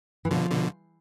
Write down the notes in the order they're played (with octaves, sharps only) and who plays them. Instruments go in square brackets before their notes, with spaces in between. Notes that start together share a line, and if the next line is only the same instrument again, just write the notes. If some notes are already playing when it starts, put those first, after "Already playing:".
[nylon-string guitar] E3
[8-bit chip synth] B2 D3 [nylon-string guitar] F3
[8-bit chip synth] B2 D3